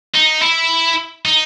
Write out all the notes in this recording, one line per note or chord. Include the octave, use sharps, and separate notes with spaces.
D#4
E4
D#4